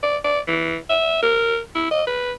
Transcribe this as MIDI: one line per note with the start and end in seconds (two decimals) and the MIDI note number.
0.03 0.17 74
0.24 0.40 74
0.47 0.76 52
0.89 1.18 76
1.22 1.58 70
1.75 1.87 64
1.91 2.03 75
2.07 2.33 71